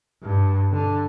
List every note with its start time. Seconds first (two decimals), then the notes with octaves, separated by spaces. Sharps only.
0.23 G2
0.72 D3